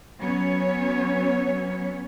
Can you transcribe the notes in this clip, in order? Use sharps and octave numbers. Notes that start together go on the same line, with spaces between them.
F#3 B3 C#4 C#5